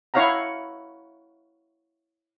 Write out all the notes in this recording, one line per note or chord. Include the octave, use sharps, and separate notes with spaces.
E4 C#5 F5 F#5 A#5